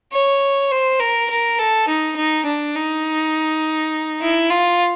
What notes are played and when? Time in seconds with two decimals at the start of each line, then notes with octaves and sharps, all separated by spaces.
0.13 C#5
0.71 C5
1.00 A#4
1.30 A#4
1.59 A4
1.88 D#4
2.16 D#4
2.46 D4
2.75 D#4
4.21 E4
4.50 F4